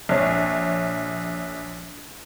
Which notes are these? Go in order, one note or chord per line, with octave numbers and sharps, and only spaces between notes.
A#1 C#5